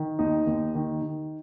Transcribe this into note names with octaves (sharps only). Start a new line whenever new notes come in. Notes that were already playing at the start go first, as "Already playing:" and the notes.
Already playing: D#3
D#2 D#4
D#2
D#3
D#3